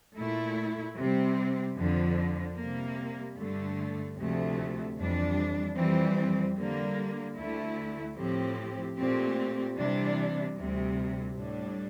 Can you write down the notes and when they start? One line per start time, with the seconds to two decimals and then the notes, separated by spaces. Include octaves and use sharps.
0.17 A#2 A3 E4
0.97 C3 G3 C4
1.77 F2 D3 F3
2.57 C3 G3 A#3
3.37 G2 D3 A3
4.17 D2 C3 F3 A3
4.97 F2 E3 G3 D4
5.77 F2 E3 G3 C4
6.57 D3 G3 A#3
7.37 D2 D3 A3 E4
8.17 A2 F3 C4 G4
8.97 A#2 A3 C4 G4
9.77 C3 E3 G3 D4
10.57 D2 C3 G3
11.37 A2 G3 D4